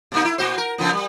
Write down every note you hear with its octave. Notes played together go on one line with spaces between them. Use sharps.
B2 A#3 D#4
E4
A#2 F#4 C5
A#4
C#3 F3 B3
G3